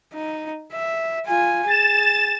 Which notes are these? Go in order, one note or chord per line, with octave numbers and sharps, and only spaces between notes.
D#4
E5
F4 G#5
G#4 A6 E7